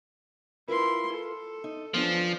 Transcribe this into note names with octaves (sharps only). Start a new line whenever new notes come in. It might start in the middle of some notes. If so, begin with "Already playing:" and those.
E4 F4 A#4 B4 C6
A4
D#4
F3 B3 C#4 D4